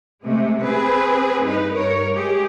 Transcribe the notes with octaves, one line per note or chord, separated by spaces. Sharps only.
C3 G#3 A3
C4 G#4 B4
G2 D#4 B4
G2 A#4 C#5
G#3 G4 G#4